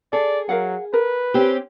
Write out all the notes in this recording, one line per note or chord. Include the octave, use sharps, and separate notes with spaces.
G#4 A4 D5
F#3 A#4 F5 F#5
A#4 B4
C4 C#4 G4